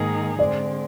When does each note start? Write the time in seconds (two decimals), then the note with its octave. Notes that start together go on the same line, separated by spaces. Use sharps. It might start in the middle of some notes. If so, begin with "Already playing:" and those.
Already playing: G#2 D#3 A#3 D#4 G#4
0.39 D3 G#3 C4 D5